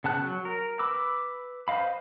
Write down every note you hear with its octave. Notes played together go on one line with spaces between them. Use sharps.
C#3 B3 A5 F#6
F#3
A#4
B4 B5 D6 E6
B4 C5 D#5 F5 B5